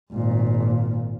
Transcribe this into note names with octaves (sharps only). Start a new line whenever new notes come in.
G#1 A#2